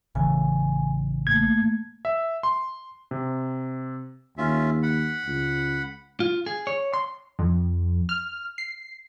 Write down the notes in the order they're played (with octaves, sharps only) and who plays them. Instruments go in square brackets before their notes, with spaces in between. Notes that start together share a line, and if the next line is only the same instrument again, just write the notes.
[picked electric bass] A1 C#3 E3 [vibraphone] G#5
[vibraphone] A3 A#3 [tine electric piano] G#6
[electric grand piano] E5
C6
C3
[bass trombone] D#2 [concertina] C#4 F4 E5
[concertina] F#5 B5
[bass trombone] C#2
[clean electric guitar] F4
G#4
C#5
C6
[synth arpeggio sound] F2
F6
C7